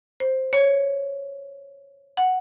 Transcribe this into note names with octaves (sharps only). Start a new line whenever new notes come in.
C5
C#5
F#5